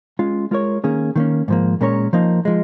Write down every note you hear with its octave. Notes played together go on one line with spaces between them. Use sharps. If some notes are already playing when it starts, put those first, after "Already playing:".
G#3 C#4 F4
G#3 F4 A#4 C#5
D#3 A#3 C#4 G#4
D#3 A#3 C#4
G#2 F3 A#3
A#2 G#3 C#4 A#4 C#5
F3 A#3 D#4
F3 G#3